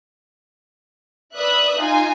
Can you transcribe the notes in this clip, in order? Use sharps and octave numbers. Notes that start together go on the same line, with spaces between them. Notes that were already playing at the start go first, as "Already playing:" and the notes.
B4 D5 E5 D#6 F#6
D#4 F4 G#5